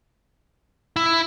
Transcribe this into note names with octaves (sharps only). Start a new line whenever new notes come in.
E4